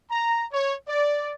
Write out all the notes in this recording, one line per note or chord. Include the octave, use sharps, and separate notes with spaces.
A#5
C#5
D5